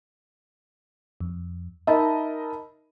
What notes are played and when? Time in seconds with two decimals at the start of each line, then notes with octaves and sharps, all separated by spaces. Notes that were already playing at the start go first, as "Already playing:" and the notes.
1.20 F2
1.87 D#4 A#4 D#5 E5 A5 B5